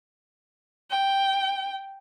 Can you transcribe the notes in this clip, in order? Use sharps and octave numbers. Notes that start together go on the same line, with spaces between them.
G5